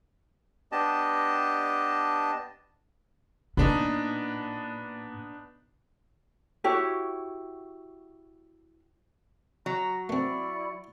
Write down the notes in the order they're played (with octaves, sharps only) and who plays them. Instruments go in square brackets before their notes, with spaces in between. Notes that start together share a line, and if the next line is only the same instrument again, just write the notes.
[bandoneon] B3 D4 G4 D#5 A5
[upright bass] A#2 [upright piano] B3 D4 D#4
[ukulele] E4 F#4 G4 C#5
[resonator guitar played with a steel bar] F#3 [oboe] A#5
[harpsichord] A3 C4 [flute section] E4 D5 [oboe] C#6